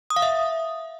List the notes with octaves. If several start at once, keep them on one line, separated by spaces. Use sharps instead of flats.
D#6
F5
E5